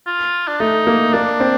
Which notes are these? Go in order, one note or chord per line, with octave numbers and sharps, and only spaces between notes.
F4
D4
A3 D#4
A#3
A#3 D4
C4